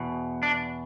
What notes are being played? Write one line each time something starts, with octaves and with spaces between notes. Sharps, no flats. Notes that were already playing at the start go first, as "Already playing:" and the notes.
Already playing: E2 B2
D4